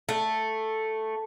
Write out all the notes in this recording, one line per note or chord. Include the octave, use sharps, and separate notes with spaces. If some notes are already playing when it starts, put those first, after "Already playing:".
A3